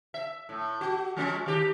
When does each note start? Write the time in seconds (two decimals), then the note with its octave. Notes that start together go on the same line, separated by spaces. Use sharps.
0.14 E5
0.49 A2
0.81 F#4
1.17 F3 G#3 C#4
1.46 D#3 G4